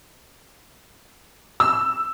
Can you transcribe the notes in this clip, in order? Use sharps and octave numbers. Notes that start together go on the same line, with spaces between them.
E6